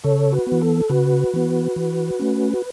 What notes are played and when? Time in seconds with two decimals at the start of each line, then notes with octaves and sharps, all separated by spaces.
0.04 C#3 A4 C#5
0.32 F#4 B4
0.47 B3
0.52 E3
0.62 A4
0.89 C#3 F#4 B4
1.34 E3 B3
1.76 E3
2.20 A3 C#4
2.54 F#4